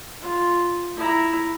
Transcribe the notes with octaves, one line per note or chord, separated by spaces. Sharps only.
F4
E4 A#5